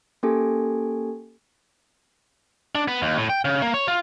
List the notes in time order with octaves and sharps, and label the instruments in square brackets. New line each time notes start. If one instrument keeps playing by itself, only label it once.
[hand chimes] A#3 C#4 G4 A4 G#5
[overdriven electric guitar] D4
B3
D#2
A2
G5
C#3
A#3
C#5
F4